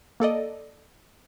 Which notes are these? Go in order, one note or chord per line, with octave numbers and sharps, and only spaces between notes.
A#3 A4 D5 D#5